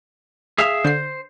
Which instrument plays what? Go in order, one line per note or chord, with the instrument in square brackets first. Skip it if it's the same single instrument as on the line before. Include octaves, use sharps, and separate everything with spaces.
[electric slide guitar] G#4 E5 F5
[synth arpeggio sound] D3 C7 [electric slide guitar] C5